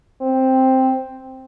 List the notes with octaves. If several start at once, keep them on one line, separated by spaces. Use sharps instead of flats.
C4